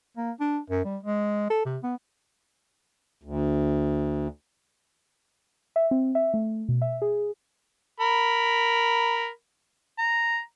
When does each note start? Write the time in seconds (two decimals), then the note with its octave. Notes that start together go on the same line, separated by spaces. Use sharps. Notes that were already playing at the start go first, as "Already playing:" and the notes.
0.17 A#3
0.40 D4
0.70 F#2
0.85 G3
1.03 G#3
1.50 A4
1.66 C3
1.83 B3
3.23 D2
5.76 E5
5.91 C4
6.15 E5
6.34 A3
6.69 B2
6.82 E5
7.02 G#4
8.00 A#4 B5
9.99 A#5